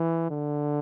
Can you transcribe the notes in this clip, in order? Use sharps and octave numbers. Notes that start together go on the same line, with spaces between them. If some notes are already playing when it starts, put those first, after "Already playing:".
Already playing: E3
D3